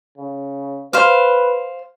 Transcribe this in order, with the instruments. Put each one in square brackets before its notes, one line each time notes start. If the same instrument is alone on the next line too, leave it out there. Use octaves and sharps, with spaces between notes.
[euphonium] C#3
[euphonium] B4 [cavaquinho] C5 F5